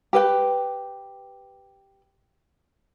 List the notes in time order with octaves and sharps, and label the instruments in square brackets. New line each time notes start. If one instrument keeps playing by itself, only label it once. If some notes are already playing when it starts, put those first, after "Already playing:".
[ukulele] G4 B4 G5